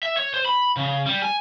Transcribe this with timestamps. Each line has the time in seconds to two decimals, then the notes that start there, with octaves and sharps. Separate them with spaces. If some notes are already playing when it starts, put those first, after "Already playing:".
0.03 E5
0.17 C#5
0.34 C5
0.46 B5
0.77 C#3
1.06 G3
1.22 G#5